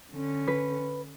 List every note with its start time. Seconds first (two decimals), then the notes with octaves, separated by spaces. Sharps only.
0.12 D3 C#4
0.48 B4